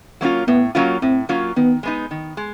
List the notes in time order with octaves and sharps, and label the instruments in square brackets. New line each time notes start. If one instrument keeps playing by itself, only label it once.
[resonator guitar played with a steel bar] F#3 A#3 C#4 F4
[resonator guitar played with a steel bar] A2 [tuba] B3
[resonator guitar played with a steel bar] F#3 A#3 C#4 F4
[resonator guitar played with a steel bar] A2 [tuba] C4
[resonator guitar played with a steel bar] F#3 A#3 C#4 F4
[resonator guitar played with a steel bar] D#3 [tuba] B3
[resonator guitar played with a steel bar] G#3 B3 D#4
D#3
G#3